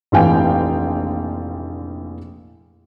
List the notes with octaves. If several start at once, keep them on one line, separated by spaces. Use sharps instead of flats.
F1 A#1 E3 F5 G5 G#5